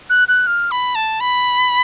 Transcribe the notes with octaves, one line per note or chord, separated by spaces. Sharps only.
F#6
F#6
F6
B5
A5
B5